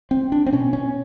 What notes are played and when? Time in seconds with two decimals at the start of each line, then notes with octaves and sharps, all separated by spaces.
0.11 C4
0.32 D4
0.46 C4
0.53 B2 C#4
0.73 C#4